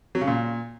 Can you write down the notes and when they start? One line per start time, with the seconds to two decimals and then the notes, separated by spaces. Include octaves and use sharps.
0.15 F#3
0.21 C#3
0.28 A#2